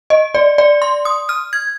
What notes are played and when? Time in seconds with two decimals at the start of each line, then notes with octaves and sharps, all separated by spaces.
0.10 D#5
0.35 D5
0.58 D5
0.82 C6
1.05 D#6
1.29 F6
1.53 G#6